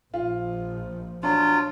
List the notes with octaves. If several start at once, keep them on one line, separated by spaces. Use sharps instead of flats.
A#1 F3 F4
F#3 D4 F4